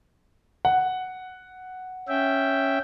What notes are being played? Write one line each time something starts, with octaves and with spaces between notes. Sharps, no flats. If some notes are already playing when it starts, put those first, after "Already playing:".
F#5
C#4 E5 G5